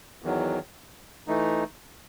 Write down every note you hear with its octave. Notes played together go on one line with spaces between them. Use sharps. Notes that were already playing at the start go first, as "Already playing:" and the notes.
E2 D#3 F#3
E3 A3 D#4